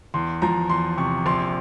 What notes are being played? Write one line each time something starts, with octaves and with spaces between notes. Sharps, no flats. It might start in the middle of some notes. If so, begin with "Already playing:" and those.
E2 C6
F3 A#5
E2 C6
C3 C#6
A#1 C6